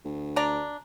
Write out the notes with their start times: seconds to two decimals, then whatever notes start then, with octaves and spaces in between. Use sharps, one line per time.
0.05 D2
0.36 D4 D5 A#5